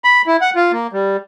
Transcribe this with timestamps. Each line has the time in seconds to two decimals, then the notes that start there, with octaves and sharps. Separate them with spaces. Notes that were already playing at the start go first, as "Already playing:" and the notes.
0.04 B5
0.27 E4
0.41 F#5
0.55 F4
0.72 A#3
0.93 G3